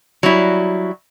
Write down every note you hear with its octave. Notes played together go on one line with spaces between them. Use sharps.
F#3 G3 E4